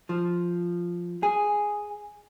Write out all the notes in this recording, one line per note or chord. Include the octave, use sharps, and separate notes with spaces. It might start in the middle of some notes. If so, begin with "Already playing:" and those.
F3
G#4